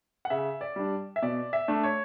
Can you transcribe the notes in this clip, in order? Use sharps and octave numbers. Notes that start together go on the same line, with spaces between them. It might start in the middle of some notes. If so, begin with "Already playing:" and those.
F#5
C#3 E5
D5
G3 D4
E5
B2 D5
E5
A3 D4
C#5